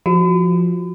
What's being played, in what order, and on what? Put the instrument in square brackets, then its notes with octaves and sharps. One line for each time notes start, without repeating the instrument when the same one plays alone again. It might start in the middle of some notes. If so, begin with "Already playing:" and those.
[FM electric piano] F3 [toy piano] F#4